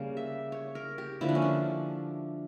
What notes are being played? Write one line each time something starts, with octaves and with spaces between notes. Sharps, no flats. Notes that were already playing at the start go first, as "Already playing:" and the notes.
Already playing: C#3 G3 A#3
E5
C#5
A#4
G4
D3 F3 A#3 E4
D4
C#4
D4